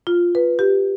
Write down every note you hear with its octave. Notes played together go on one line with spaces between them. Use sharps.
F4
B4
G4